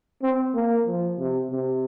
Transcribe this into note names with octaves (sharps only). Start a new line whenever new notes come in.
C4
A#3
F3
C3
C3